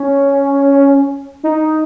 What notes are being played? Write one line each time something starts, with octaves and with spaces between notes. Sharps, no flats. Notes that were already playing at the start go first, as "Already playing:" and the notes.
Already playing: C#4
D#4